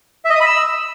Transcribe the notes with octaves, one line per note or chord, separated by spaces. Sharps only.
E5
D#5
D#6
B5
E6